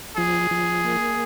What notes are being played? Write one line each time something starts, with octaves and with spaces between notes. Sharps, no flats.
F3 G#4
F3
A#3